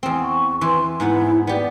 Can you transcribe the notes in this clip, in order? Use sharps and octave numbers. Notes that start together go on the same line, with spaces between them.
E2 C4
C#6
E3 C6
G#2 B3 E4 F#5
B3 G4 D5